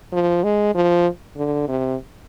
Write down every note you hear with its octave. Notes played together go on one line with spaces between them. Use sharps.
F3
G#3
F3
D3
C3